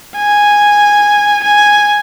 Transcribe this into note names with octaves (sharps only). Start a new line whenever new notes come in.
G#5
G#5